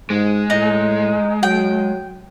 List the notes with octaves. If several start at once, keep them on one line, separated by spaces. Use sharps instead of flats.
G#2 G#3
A2 D#4
F#3 G5